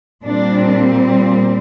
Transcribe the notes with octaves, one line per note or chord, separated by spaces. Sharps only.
A#2 G3 C4 D4